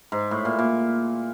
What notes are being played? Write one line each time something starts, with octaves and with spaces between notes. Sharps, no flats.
G#2
A2
A#2
A#2